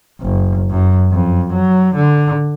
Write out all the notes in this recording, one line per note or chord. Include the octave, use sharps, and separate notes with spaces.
F#1
F#2
F2
F#3
D3